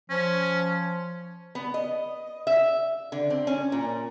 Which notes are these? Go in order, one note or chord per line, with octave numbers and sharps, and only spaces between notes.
F3 C#4
B3
D#5
E5
D3
C4
C#4
A#2